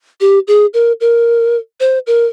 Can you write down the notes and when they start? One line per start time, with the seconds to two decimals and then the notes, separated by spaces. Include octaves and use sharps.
0.21 G4
0.48 G#4
0.74 A#4
1.01 A#4
1.80 C5
2.07 A#4